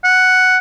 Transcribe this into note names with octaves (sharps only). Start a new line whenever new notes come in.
F#5